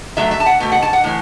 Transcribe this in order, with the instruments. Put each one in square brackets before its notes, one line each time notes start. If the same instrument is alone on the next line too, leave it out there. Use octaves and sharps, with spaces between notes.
[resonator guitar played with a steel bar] B2 F#3 A3 E5
E5
A5
F#5
B2 A3
F#5
A5
F#5
A2 E3